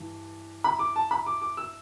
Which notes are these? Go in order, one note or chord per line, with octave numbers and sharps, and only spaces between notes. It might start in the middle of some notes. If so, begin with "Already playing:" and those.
Already playing: G2 E3
B5
D6
A5
B5
D6
D6
E6